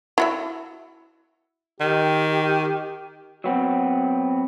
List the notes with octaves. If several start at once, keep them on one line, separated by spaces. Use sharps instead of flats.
E4 F#4 E5
D#3 G4
F#3 B3 C4